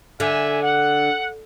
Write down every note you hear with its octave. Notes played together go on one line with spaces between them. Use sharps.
D3 E5 G#5
F#5